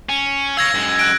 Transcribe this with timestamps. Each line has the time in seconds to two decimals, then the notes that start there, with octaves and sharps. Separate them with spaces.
0.09 C#4
0.57 C#5 F5 E6 G#6 A#6
0.75 F#2 G#3
0.99 F#6 D7